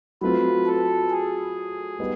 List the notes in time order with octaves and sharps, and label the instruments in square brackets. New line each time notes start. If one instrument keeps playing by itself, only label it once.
[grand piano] F#3 A3 C4 F4 [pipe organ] B4
[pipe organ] A4
G#4
[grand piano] G3 B3 D#4